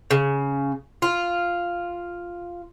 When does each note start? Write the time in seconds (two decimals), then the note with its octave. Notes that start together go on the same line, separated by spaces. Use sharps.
0.11 C#3
1.02 F4